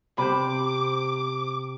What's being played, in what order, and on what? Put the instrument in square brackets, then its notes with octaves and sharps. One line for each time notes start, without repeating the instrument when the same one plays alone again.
[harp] C3 [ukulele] C5 B5 [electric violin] D6